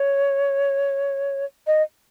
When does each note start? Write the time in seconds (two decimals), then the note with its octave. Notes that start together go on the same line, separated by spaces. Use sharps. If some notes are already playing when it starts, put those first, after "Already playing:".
Already playing: C#5
1.67 D#5